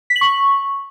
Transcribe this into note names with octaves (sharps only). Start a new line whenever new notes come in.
B6
F#7
C#6